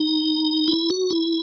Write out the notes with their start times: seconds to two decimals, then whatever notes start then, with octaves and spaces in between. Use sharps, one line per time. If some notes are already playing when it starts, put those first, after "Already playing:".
Already playing: D#4
0.68 E4
0.90 F#4
1.10 E4